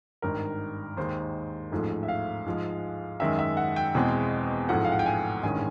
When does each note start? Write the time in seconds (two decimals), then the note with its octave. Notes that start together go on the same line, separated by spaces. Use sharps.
0.22 G#1 G2 D#3 A#4
0.97 D#2 D#3 G#3 C5
1.72 A1 G#2 F3 A3
2.03 E5
2.08 F5
2.46 G#2 F3 G#3
3.20 F#2 D#3 G#3 E5
3.39 E5
3.57 F#5
3.76 G5
3.95 E2 B2 G#3 C4
4.69 A1 G#2 F3 A3 F#5
4.85 F5
4.92 F#5
4.99 G5
5.06 G#5
5.43 A1 G2 D#3 G#3 C#4 G#5